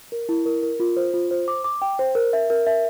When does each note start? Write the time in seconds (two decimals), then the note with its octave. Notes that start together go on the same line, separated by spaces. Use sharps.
0.12 A#4
0.29 E4
0.46 A#4
0.63 A#4
0.80 F4
0.97 C5
1.14 F4
1.31 C5
1.48 D6
1.64 D6
1.82 G5
1.99 C5
2.15 A#4
2.33 E5
2.50 A#4
2.67 E5